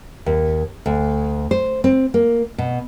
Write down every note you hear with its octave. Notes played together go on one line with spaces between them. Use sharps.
D#2
D2
C5
C4
A#3
B2